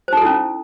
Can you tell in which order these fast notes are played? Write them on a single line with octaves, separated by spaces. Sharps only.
C5 D#4 A4 E4 C#4